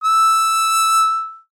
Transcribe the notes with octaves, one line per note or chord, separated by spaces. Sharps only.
E6